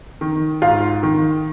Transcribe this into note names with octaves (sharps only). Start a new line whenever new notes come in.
D#3
G#2 F4
D#3